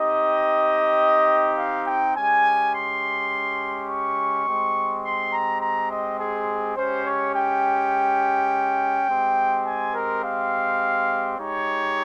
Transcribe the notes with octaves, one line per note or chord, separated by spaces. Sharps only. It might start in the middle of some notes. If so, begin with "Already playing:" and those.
Already playing: C4 D#4 G4 D#5
F5
G5
G#3 C#4 G4 G#5
C6
C#6
G#3 C4 G4
C6
A#5
A#5
D#5
G#4
G#3 C#4 G4 C5
C#5
G5
G#3 C4 G4
G#5
A#4
F5
G#3 D#4 G4 C#5